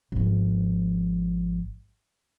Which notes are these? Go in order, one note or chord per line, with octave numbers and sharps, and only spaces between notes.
G#1 F3